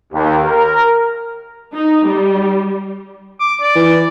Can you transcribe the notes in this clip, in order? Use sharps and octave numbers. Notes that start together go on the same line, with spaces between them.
D#2
A#4
D#4
G3
D6
D5
E3